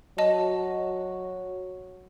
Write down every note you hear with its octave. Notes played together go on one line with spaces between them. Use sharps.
F#3 D#5 A5